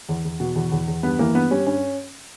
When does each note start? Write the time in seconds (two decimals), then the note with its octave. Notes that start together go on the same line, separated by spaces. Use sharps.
0.09 E2
0.25 E2
0.40 B2
0.56 E2
0.72 E2
0.88 E2
1.03 G2 B3
1.19 E3 A#3
1.35 G2 B3
1.51 G3 C#4
1.66 G2 C#4